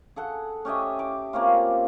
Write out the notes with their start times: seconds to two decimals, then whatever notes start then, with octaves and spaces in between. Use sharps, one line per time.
0.16 G#4 A4 F#5
0.65 C#4 G4 D#5 E5
0.99 D6
1.33 A#3 C4 C#4 F4